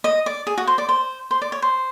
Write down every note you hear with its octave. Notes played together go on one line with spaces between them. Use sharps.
D#5
D5
G#4
F#4
C5
D5
C5
C5
D5
C#5
C5